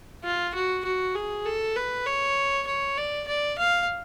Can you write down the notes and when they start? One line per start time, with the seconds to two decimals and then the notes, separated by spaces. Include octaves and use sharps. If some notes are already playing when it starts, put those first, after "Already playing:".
0.24 F4
0.55 F#4
0.85 F#4
1.15 G#4
1.46 A4
1.76 B4
2.06 C#5
2.67 C#5
2.97 D5
3.28 D5
3.58 F5